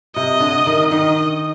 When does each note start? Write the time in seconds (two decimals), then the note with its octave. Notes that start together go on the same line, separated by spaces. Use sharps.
0.16 C3 D#5
0.40 D3
0.67 D#3
0.91 D#3 D#5